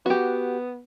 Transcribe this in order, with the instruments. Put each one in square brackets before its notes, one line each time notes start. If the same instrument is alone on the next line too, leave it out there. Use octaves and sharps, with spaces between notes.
[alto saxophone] B3 [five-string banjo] F#4 G4